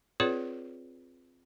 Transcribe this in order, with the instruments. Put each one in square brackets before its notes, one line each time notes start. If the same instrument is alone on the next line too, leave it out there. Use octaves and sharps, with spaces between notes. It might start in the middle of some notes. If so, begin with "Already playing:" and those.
[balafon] C4 F4 G#4 B4 C#5 D5